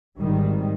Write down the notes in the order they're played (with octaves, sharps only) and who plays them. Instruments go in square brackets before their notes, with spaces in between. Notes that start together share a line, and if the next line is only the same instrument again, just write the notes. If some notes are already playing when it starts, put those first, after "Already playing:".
[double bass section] G#1 G#2 D#3 G3